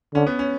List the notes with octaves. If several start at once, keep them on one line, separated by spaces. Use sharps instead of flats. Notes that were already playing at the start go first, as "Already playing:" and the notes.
D3 C#4
B3
C#4